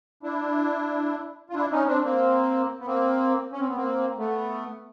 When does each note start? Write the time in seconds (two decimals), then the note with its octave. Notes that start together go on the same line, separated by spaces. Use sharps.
0.23 D4 E4
1.50 F4
1.54 D4 E4
1.72 C#4 D#4
1.87 C4 D4
2.04 A#3 C4
2.80 B3
2.87 A#3 C4
3.53 C#4
3.60 C4
3.69 B3
3.76 A#3 C4
4.18 A3 B3